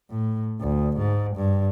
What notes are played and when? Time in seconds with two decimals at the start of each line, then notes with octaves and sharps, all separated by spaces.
0.10 A2
0.60 D2
0.97 G#2
1.36 G2